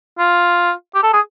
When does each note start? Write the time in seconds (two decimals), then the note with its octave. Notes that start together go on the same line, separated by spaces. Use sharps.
0.19 F4
0.95 G4
1.03 A4
1.13 G#4